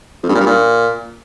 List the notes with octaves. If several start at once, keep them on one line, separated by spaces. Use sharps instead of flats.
F2
G2
A#2
G2
A#2